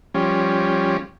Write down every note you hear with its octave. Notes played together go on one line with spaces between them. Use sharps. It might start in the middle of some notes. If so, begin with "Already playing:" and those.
F3 G3 C#4